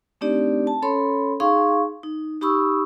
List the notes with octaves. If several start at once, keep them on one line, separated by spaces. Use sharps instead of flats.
A3 C4 D4 D#4 G4 D5
A5
C#4 A4 C#5 B5 C6
D#4 G#4 F5 C6 C#6
D#4
D#4 G4 B5 C#6 D#6 E6